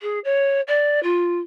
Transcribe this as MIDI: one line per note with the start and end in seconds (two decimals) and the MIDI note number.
0.02 0.19 68
0.24 0.61 73
0.68 1.02 74
1.03 1.40 65